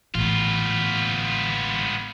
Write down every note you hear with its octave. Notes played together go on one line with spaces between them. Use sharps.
A1 B3 F4